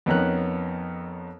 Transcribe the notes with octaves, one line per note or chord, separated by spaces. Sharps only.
F2 B3 C#4 D#4 A#4 F#6